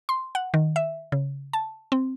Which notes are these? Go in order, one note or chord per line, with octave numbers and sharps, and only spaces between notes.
C6
F#5
D#3
E5
C#3
A5
C4